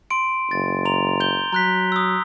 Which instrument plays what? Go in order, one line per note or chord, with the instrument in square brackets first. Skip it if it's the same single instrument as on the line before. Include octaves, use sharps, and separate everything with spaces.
[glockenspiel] C6 D7
[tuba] F#1 [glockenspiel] A6
[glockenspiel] A#5 C6 F7
G6 G7
[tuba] F#3 [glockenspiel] A#5 F#6 B6
[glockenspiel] D#6 E6